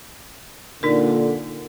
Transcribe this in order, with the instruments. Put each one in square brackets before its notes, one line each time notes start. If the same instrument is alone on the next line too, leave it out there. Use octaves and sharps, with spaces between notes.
[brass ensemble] A#2 D3 [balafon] D#4 A#4